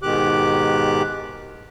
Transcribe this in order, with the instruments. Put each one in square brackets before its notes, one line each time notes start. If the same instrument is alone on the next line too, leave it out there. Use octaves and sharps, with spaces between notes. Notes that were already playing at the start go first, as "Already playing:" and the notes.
[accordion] G#2 B2 D#3 G4 D6 F#6